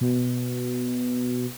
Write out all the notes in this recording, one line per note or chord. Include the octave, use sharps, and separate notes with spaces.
B2